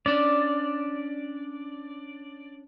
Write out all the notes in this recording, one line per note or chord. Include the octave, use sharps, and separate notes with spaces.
C#4 D4 D5